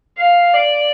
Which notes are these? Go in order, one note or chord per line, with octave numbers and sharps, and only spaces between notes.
F5
D5